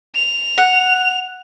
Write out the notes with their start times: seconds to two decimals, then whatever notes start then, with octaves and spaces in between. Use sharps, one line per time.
0.16 F7
0.58 F#5